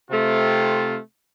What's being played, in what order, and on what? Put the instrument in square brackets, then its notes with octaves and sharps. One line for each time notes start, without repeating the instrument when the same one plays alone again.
[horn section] C3 A3 C4 F4